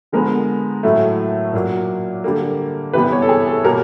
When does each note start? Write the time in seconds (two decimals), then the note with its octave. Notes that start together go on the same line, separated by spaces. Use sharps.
0.12 D3 F3 G#3 B3 A#4
0.83 A2 F#3 A3
1.53 A#2 F#3 A#3
2.24 D3 G3 A#3
2.93 C3 E3 G3 B3 B4
3.12 C#5
3.22 A4
3.29 G#4
3.47 A4
3.64 B2 G3 A#3 A#4